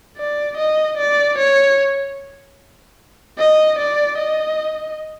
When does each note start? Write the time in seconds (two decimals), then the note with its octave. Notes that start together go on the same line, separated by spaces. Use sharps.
0.18 D5
0.58 D#5
0.98 D5
1.39 C#5
3.39 D#5
3.79 D5
4.19 D#5